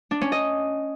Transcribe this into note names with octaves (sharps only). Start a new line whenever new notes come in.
D4
C#4
D#5